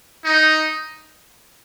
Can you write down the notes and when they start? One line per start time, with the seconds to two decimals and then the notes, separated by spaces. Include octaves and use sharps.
0.25 D#4